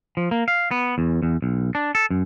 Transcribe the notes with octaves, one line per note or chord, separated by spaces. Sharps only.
F3
A#3
F5
B3
E2
E2
B1
D4
A4
F#2